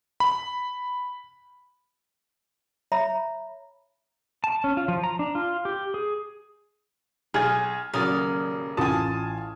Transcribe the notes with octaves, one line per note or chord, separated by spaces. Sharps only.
B5
C#5 E5 A#5 B5
A5
C#4
F4
F3
A#5
D4
F4
G4
G#4
B1 G#4 F6 G#6
D#1 C#3 F#3 A#4 D5 D#6
A1 F4 G#5 A5 D#6